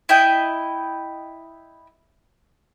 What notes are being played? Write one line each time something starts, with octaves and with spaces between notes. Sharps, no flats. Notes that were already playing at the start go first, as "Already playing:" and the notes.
E4 D#5 G5